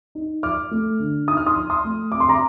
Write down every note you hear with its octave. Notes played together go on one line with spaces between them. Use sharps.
D#4
F3 D6 F6
A3
D3
D#4 D#6
F6
C6 D#6
F3
C6 D#6
A3
F2 D6
C6
A#5 D6